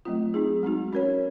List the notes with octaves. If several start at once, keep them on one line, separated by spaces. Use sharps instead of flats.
F#3 A3 C4 F4
C4 D#4 G#4
G#3 C4 D#4 F#4
C#4 F#4 A#4 C#5